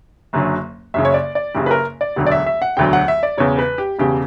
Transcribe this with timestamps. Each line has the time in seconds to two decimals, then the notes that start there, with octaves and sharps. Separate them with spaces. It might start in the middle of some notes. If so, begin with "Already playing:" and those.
0.33 F#1 F#2 D3 F#3
0.94 F#1 F#2 C#3 E5
1.05 C#5
1.14 D5
1.35 D5
1.55 F#1 F#2 C#3 G4
1.66 B4
1.71 A#4
2.01 D5
2.16 E1 D2 D3 F#3
2.26 D5
2.32 E5
2.46 E5
2.62 F#5
2.77 E1 D2 D3 F#3 G5
2.93 F#5
3.08 E5
3.23 D5
3.38 E1 E2 C#3 C#5
3.59 B4
3.78 G4
3.99 E1 E2 C#3 G4